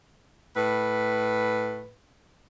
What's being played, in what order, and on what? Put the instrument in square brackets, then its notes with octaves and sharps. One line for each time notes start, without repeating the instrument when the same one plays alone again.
[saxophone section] A2 B4